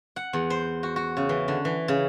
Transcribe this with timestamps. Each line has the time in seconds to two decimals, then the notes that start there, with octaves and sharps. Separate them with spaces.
0.16 F#5
0.33 E2
0.50 C5
0.83 F#4
0.96 F#4
1.17 C#3
1.29 E3
1.48 D3
1.65 E3
1.88 C#3